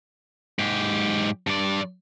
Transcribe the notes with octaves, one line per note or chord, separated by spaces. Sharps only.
G#2 G4
G2 D5